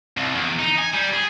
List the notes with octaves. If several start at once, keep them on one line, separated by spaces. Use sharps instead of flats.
C2
E2
D#4
G#5
G3
G#4